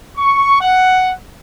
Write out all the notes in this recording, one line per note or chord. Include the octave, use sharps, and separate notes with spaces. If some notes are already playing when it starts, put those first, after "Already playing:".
C#6
F#5